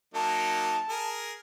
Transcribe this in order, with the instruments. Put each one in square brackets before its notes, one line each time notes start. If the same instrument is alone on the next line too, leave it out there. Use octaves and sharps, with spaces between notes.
[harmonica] F#3 A#3 D#4 [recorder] A5
[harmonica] G#4 A#4